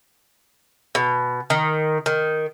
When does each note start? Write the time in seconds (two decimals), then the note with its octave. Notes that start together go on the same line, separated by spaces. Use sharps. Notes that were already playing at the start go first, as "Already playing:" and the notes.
0.95 B2
1.50 D#3
2.06 D#3